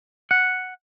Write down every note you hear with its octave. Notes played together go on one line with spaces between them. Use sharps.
F#5